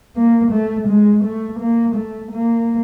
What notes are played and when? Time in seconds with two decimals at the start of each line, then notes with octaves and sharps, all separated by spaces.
0.17 A#3
0.52 A3
0.89 G#3
1.24 A3
1.60 A#3
1.96 A3
2.32 A#3